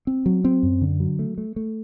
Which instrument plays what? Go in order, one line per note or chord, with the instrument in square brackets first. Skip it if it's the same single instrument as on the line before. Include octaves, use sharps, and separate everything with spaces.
[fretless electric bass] C4
F#3
C4
F#2
D3
F#3
A3
A3
A3